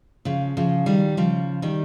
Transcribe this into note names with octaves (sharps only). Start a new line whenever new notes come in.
C#3 F3
C#3 F3
D#3 G3
C#3 F3
D#3 G3